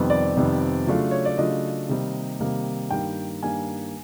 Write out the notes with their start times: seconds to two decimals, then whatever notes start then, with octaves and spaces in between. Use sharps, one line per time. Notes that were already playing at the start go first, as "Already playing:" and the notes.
Already playing: F2 C3 D#3 G3 B3
0.10 D5
0.37 F2 C3 D#3 G3 B3
0.87 C#3 F#3 A3 D4 F4
1.11 C#5
1.25 D5
1.38 C#3 F#3 A3 D4 F4 D#5
1.89 C3 D#3 G3 A#3 D#4
2.40 C3 D#3 G3 A#3 D#4
2.91 G2 D#3 G3 A#3 G5
3.42 G2 D#3 G3 A#3 G#5